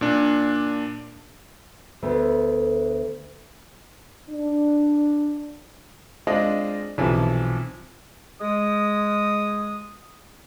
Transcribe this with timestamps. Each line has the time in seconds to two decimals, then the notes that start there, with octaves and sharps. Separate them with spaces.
0.01 A#2 D4
2.03 D2 A3 B3
4.30 D4
6.27 G#3 C4 D4 F4 D#5 F5
6.98 B1 C3 E3 F3
8.41 G#3 D#6